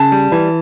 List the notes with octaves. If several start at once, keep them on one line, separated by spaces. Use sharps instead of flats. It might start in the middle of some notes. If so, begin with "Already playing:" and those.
Already playing: C#3 A5
G3
E3